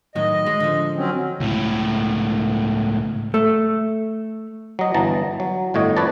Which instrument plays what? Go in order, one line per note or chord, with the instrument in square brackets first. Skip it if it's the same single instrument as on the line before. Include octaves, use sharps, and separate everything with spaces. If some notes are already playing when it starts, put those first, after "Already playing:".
[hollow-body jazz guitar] A2 D#3 F#3 [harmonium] D#5
[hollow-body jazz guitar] G#3
D3 F3
[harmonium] F#3 C4 C#4
[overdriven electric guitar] C#2 A2
[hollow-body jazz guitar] A3
[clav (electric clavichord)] F#3 D#5
G1 E3 A5 A#5
F#3
G1 A2 C#5 D#5
F2 B4 C#5 D5 A5